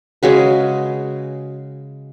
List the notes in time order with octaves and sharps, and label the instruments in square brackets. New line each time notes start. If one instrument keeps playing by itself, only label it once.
[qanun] C#3 G#3 F#4 B4